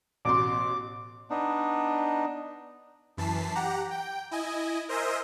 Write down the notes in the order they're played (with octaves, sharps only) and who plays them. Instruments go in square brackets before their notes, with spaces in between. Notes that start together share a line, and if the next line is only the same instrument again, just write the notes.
[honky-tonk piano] A1 B2 C6 [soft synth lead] D6
[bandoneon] B3 D4 D#4
[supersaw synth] F#2 E3 A5 B6 C7
G4 F#5 A#5
G5
E4 D#5 G#5
A#4 C5 D#5 E5 G#5 C6